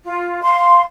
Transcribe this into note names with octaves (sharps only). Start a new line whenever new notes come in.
F4
F5 C6